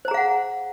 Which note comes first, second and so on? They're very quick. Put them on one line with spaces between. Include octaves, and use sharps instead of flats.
C5 A#5 G#4 F5 F#5